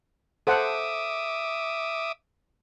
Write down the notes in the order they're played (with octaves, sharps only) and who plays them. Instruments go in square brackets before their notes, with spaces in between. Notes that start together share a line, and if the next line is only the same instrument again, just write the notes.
[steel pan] A4 C5 F#5 [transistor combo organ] E5 D6 D#6